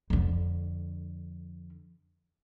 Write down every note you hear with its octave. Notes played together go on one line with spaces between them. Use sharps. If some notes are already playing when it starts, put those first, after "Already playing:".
F2 D3